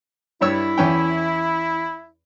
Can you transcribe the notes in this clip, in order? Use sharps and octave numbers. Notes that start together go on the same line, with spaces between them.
G2 E4 C#5 E6
E2 C#4 G5